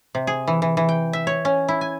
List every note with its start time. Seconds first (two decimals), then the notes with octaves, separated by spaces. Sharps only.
0.15 C3
0.27 G#4
0.47 E3
0.62 E3
0.77 E3
0.89 G5
1.13 E5
1.27 C#5
1.45 C#4
1.68 E4
1.81 G#5